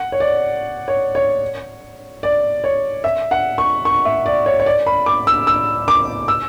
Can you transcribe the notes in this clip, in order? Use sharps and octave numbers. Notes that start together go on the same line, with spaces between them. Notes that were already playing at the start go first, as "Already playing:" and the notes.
Already playing: F#5
C#5
D5
C#5
C#5
D5
C#5
E5
F#5
C#6
C#6
E5
D5
C#5
C#5
D5
B5
D6
E6
E6
D6
E6